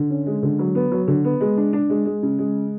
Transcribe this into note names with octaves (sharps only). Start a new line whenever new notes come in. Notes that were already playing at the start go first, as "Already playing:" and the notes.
Already playing: D3
C#4
G#3
D3
F#3
B3
F#3
D3
B3
G#3
D4
D4
G#3
G#3
C#3
G#3